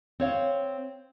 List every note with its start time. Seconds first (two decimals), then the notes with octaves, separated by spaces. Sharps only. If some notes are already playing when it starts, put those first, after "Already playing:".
0.20 C4 C#5 F5